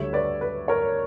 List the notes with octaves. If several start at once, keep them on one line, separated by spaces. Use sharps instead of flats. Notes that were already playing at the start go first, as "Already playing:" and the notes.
Already playing: D2 D3 G3 C#5 E5
B4 D5
B4
A#4 C#5